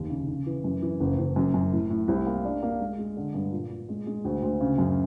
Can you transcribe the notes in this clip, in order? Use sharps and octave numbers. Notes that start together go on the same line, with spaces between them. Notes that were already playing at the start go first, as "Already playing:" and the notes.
Already playing: F1 D#2
C#3
C#3
E3
F#2
E3
F#1
F#1
F#2
F#2
A2
A2
C2
A#3
D4
A#3
G#3
G#3
D3
G2
A#2
A#2
G#3
G#3
D2
D2
C#3
F#2